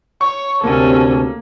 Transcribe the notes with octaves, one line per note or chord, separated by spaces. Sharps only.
C#5 C#6
D2 C3 A#3 C#4 A4